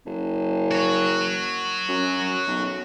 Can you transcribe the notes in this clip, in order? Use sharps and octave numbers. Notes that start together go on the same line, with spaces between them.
F#1
F#4 C#5
F#2
B1